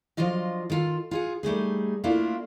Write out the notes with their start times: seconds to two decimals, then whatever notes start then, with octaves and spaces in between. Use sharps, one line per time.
0.17 F3 F#3 D4 F4 D#5
0.70 D#3 F4 A4
1.11 F4 G#4 F#5
1.43 G3 A3 D#4 G#4
2.04 A3 A#3 D4 E4 F4